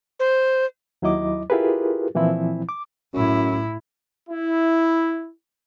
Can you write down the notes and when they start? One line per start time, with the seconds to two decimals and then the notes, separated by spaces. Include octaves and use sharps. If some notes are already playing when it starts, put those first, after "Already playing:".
0.19 C5
1.02 D#2 F#3 E4 D#5 D6
1.50 E4 F4 G4 G#4 A#4 B4
2.15 A#2 E3 F3 C4 E4
2.69 D6
3.14 F#2 A2 E4
4.30 E4